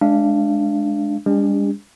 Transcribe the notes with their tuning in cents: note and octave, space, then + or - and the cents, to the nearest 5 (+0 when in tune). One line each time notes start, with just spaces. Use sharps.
G#3 +20 D4 +0 F5 -30
G#3 -45 D4 -35 G4 +40